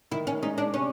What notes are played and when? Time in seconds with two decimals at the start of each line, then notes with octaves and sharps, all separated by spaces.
0.12 D#3 E4
0.27 C#4
0.42 G#3 C#4 D#4
0.58 D4
0.74 C3 C#4